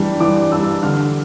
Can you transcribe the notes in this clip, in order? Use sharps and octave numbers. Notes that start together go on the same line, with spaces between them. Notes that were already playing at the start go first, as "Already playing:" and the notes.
Already playing: E3 G3 D4
E3 D6
G3 D4 E6
D3 F6